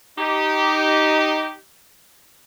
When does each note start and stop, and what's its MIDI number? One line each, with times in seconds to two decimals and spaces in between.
0.18 1.54 63
0.18 1.54 67